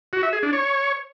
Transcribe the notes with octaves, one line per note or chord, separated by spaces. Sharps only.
F#4
E5
G#4
D4
C#5